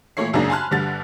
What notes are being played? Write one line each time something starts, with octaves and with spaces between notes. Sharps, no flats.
A#2 E3 A3 E4 C#5 C7
F#2 C#3 G#3 A#3 D4 D#4
G#5 A5 B5 C6 F6 F#6
G1 D3 G3 A6